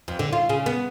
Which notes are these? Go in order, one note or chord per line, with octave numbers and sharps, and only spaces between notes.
F2
D3
F4
C#3
B3